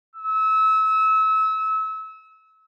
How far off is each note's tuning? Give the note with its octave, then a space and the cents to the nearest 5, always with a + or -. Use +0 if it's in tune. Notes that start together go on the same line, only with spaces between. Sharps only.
E6 -30